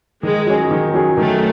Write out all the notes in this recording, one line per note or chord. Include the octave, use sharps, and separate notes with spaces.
D#3 G#3
F#3 C#4 G#4
D#3
F#3 C#4 G#4
D#3 F#3 A3